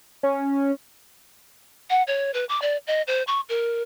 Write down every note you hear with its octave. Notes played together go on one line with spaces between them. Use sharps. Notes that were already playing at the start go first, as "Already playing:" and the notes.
C#4
F#5
C#5
B4
D6
D5
D#5
C5
C#6
A#4